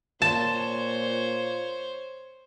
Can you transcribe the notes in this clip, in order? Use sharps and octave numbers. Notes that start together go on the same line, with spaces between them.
A#2 C5 C#5 A5